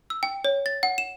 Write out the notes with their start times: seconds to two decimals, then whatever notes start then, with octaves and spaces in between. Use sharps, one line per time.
0.10 E6
0.23 G5
0.45 C#5
0.66 A6
0.83 F#5
0.98 E7